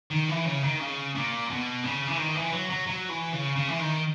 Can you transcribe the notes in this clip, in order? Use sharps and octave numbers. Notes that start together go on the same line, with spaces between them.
D#3
E3
C#3
D#3
C#3
A#2
B2
C#3
E3
D#3
E3
F#3
F#3
F#3
E3
C#3
C#3
E3
D#3